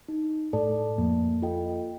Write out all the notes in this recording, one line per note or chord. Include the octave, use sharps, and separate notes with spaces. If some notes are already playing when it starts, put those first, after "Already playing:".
D#4
A2 A4 D5 A5
F2 A#3
F4 A4 D#5 G5